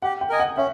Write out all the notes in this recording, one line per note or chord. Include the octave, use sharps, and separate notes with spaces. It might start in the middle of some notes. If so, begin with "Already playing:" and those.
G4 F#5
G5
A#4 D#5 G#5
F#5
C#4 E5